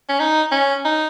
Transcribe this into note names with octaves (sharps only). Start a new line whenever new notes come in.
C#4
D#4
C#4
D#4